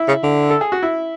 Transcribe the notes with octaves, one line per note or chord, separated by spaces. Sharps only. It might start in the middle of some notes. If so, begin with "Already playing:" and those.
Already playing: E4
C#3
D3
A4
G#4
F#4
E4